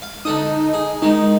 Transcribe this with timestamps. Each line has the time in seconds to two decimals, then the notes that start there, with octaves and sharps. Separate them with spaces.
0.02 F5
0.25 D3 D#4 A4 D#6
0.74 G#4
1.02 D#3 G#3 D#4